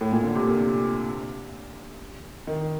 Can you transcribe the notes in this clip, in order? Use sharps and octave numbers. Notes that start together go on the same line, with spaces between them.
A2
A#2
D3
C3
A#2
D#3